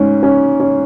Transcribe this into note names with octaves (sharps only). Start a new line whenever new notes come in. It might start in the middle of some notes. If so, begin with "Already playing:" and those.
Already playing: G#2 C#4
C#4
C#4